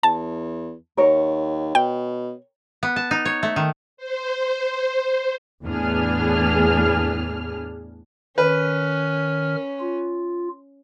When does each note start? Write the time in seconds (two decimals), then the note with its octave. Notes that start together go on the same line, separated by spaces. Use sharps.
0.03 E2 A5
0.97 D#2 A#4 C#5
1.75 B2 G5
2.83 B3
2.96 A5
3.11 D#4
3.25 C#5
3.43 A3
3.56 D#3
3.97 C5
5.65 E2 A2 B3 D4 G#4 F6
8.38 D#3 C#4 B4 F6
9.80 F4